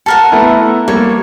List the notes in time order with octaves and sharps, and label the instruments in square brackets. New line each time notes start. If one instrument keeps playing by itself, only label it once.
[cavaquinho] A4 A#4 F#5 [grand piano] A5
[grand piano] A3 B3 E4
[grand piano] G3 A#3 G4 [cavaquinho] C#5